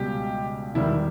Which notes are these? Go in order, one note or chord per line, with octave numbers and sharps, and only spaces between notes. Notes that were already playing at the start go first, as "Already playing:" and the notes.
Already playing: C#2 B2 G3 G4
E1 E2 D#3 G3 E4